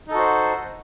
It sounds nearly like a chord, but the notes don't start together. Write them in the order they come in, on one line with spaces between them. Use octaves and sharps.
D#4 A4 F#4 C5